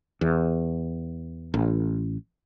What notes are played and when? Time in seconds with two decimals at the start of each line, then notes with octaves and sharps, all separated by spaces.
0.21 E2
1.54 A1